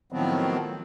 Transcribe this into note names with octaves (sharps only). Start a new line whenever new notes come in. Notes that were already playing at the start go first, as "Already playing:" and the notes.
A2 D#3 F3 F#3 B3 C4